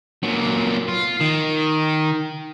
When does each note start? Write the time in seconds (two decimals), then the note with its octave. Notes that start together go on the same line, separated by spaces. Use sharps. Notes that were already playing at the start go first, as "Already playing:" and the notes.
0.23 A#2 F#3
0.88 F4
1.20 D#3